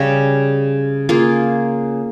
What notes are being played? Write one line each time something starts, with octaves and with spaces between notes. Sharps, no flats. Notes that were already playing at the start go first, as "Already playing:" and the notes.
Already playing: C#3 G3 C#4
A#3 F4 G#4